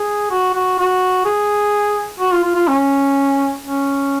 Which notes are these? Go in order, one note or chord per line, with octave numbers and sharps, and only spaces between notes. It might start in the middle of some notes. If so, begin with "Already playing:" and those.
Already playing: G#4
F#4
F#4
F#4
G#4
F#4
F4
F4
F4
C#4
C#4